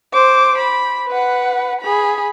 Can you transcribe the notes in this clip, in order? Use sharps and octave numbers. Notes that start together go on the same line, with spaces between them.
C5 D6
B5
B4 F#5
G#4 B5